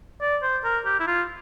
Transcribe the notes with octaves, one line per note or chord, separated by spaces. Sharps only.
D5
C5
A#4
G4
E4
F4